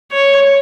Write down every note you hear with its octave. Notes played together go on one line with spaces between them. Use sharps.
C#5